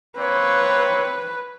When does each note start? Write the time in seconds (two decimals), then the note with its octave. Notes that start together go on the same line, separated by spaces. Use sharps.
0.18 A#3 C4 B4 C#5